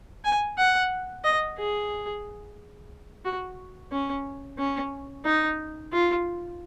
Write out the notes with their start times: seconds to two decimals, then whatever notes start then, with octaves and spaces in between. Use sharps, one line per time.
0.24 G#5
0.58 F#5
1.24 D#5
1.58 G#4
3.25 F#4
3.92 C#4
4.58 C#4
5.25 D#4
5.93 F4